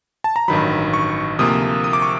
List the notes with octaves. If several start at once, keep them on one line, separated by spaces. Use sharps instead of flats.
A5
A#5
A1 G2 D#3 F#3 B5
C#6
D2 C3 F3 A#3 D#6
D#6
D6
C#6